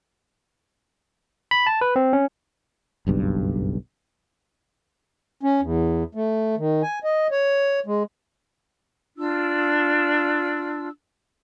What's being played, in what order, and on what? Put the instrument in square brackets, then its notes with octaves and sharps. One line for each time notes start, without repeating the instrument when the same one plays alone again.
[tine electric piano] B5
A5
B4
C4
C#4
[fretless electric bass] F#1 B1 G2
[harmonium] C#4
E2
A3
D#3
G#5
D#5
C#5
G#3
[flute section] D4 F4 E6